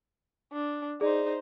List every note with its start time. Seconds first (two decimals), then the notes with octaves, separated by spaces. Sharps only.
0.53 D4
1.01 D#4 G#4 C5 D5